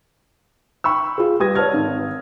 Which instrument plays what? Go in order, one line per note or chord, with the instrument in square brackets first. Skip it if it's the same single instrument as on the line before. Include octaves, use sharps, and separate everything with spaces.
[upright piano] G5 B5 C#6 E6
F4 G#4
G3 G4 B4 D#6 G#6 A#6
C#5 D5 A5 F6 G#6
G#1